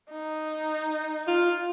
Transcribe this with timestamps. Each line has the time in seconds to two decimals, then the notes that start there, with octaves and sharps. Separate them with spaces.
0.11 D#4
1.27 F4